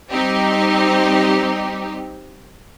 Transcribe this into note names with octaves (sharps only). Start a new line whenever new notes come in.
G3 C4 D#4 G4